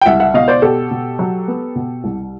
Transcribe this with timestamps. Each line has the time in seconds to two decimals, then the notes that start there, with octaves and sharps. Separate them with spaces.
0.01 G5
0.06 C2 E5 F#5
0.20 E5 F#5
0.34 B2 D#5 F5
0.48 C5 D5
0.62 B2 G4 A4
0.91 B2
1.19 F#3
1.48 B3
1.75 B2
2.04 C2